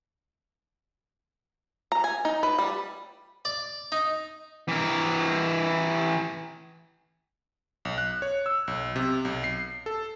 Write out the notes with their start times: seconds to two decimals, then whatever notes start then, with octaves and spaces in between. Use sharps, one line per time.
1.92 A#5
2.04 G#5
2.25 D#4
2.43 B4
2.59 G3
3.45 D5
3.92 D#4
4.68 E3 A#4
7.85 B1
7.98 F#6
8.22 C#5
8.46 E6
8.68 B1
8.96 C3
9.25 B1
9.44 C7
9.86 A4